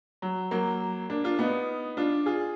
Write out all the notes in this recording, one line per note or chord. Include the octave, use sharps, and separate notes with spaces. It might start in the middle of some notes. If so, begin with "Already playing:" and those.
F#3
F#3 A#3
A#3 D4
D4 F4
B3 D#4
D4 F4
F4 G#4